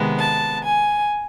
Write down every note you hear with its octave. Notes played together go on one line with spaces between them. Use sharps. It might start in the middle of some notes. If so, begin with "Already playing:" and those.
Already playing: C3 D#3 G#3 B3
A5
G#5